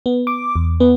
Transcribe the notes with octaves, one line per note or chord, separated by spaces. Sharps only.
B3
D6
E2
B3